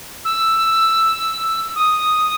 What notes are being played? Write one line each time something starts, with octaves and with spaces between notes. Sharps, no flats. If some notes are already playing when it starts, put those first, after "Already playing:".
E6
D#6